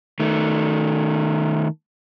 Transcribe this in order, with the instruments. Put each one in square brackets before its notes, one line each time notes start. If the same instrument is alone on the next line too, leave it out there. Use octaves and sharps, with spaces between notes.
[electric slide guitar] D#3 A3